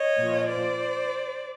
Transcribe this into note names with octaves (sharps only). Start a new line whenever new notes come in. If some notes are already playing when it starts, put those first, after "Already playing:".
Already playing: C#5 D#5
A#2 F3
C5 D5